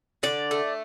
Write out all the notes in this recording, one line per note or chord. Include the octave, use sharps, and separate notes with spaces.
D3 D5
A3